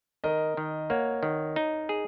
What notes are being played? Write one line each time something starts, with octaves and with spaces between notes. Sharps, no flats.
D#3 A#4 D#5
D#3
A#3 C#5 F#5
D#3
D#4
G#4